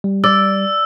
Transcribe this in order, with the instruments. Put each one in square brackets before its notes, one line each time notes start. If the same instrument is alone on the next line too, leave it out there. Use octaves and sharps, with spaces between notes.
[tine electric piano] G3
[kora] D5 [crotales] E6